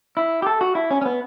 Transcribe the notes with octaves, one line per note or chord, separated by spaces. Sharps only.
E4
G4
A4
F#4
E4
C#4
C#4
B3